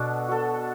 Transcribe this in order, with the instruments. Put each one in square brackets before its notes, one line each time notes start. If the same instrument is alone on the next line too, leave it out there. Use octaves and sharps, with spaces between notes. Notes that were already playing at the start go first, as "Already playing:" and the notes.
Already playing: [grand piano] B2 [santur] D4 F#4 A4
[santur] F#4 A4